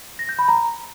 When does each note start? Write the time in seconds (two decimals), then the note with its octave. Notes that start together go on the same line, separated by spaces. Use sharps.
0.19 A#6
0.29 G6
0.39 B5
0.48 A#5